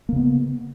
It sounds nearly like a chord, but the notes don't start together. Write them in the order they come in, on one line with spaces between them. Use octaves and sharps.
A#3 C#3 B3